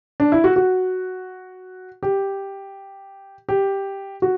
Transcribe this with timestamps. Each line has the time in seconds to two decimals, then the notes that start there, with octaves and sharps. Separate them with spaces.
0.20 D4
0.32 E4
0.44 F#4
0.56 F#4
2.03 G4
3.49 G4
4.22 F#4